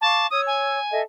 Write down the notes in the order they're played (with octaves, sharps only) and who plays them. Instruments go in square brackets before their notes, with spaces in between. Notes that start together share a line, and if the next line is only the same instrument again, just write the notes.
[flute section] F5 C#6 D6 [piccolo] A5
[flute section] C#5 E6 [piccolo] D#6
[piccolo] G#5
[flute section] A4 D#5 E5